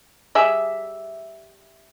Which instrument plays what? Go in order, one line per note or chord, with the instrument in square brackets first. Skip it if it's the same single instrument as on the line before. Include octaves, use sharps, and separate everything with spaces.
[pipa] G3 G#4 E5